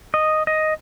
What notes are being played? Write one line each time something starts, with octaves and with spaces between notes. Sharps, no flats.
D#5
D#5